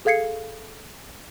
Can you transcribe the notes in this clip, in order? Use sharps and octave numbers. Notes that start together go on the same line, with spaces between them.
G#4 A4 F5 G#6 C7 C#7